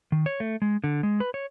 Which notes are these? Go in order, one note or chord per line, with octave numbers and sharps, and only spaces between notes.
D#3
C#5
A3
G#3
D3
G#3
B4
C#5